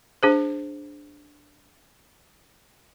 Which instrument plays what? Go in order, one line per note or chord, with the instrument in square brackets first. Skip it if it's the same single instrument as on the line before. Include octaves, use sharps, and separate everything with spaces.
[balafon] D4 G#4 C5